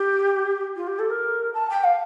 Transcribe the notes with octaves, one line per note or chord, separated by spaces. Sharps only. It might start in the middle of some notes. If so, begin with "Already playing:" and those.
Already playing: G4
F4
G4
A4
A#4
A5
G5
F5